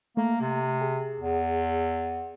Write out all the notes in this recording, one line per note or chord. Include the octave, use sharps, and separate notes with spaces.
A3 A#3
C3
G#4
E2